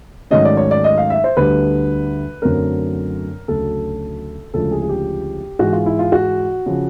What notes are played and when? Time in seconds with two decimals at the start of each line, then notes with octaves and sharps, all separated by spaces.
0.31 G#2 D#3 F#3 A3 C#4 D#5
0.45 D5
0.57 C#5
0.71 D5
0.84 D#5
0.97 F5
1.10 E5
1.24 C5
1.37 D2 D3 G3 B4
2.42 F#2 D3 F#3 A3 C4 A#4
3.48 D2 C#3 F#3 A4
4.54 D2 C#3 F3 G#3 A4
4.72 G#4
4.82 G#4
4.89 G4
5.59 G#2 E3 G#3 F#4
5.72 F4
5.86 E4
5.99 F4
6.12 F#4
6.66 C#3 F3